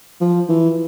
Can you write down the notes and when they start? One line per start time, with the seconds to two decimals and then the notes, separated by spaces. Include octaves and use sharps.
0.21 F3
0.49 E3